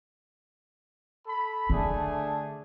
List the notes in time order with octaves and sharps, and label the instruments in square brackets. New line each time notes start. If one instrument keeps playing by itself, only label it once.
[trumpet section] A4 B5
[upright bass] D3 [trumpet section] A3 D4 G#4